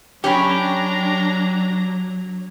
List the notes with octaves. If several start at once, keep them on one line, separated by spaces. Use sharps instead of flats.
F#3 C#4 D4 G4 C#5 G5 A#5 B5